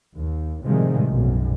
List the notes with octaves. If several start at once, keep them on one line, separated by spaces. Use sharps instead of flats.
D#2
A2 C3 D#3 F3 G3 G#3
B1 F#2